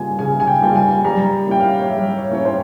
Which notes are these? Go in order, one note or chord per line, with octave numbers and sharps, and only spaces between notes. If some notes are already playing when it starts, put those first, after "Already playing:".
Already playing: C#3 G3 A#3 F4 G#5
C#3 G#5
G#5
G5
G3 A#3 F4 G5
G#5
G3 A#5
A#3 C#4 E4 G5
F5
C#5
G3 E5
C#5
A#3 C#4 E4 C#5
C5